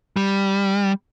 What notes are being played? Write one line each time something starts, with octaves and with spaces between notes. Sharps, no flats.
G3